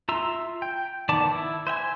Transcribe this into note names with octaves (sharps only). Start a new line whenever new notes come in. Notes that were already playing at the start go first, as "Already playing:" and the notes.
F4 E5 A#5 C6 E6
G5
D#3 B3 D5 A5 D6
E4
C5 E5 G5 G#5